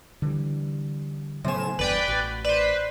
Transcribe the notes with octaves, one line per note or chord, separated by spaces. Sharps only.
D3 E3 G3
A2 C#3 F#3 B3 C5 G#5 E7
F#1 E2 G2 B4 D5 G5
A1 F#4
B4 C5 D5